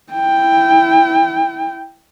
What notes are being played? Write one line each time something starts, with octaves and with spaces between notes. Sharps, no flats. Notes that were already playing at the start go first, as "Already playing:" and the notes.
E4 G5